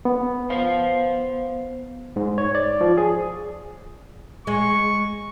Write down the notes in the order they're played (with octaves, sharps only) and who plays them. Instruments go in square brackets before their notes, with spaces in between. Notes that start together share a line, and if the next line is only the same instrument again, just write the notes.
[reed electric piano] B3
[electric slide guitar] C5 F5
[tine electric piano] G#2
C#5
D5
F3
G#4
[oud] G#3 [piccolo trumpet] C#6